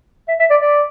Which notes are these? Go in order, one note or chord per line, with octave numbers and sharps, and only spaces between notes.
E5
E5
D5
D5